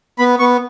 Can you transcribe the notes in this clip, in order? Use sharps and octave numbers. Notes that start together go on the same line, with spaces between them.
B3 B5
B3 C#6